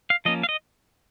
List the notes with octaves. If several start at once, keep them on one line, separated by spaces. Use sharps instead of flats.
F5
F3 A#3 C#4 D#5
F5
D#5